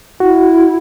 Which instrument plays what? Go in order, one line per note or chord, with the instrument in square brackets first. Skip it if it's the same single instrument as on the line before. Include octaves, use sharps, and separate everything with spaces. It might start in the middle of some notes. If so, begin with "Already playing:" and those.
[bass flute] E4 [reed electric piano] F#4